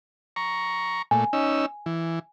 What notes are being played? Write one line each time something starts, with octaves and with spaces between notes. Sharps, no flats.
A#5 C#6
A#2 A3 G#5
C#4 D#4 E6
E3